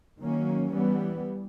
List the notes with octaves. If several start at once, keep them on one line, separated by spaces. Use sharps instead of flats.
D#3 F#3 A#3 C#4
E3 G3 B3